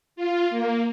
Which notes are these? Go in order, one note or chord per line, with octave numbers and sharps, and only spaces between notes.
F4
A#3